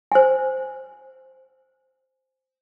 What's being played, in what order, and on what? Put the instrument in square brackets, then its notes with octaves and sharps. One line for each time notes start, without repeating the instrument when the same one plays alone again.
[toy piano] C5 G#5